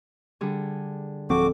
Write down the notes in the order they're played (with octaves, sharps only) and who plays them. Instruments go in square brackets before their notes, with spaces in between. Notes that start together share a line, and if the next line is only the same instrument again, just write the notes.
[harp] D3 G3 G#4
[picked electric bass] D1 F3 C4 [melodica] F#4 D6 [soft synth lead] A4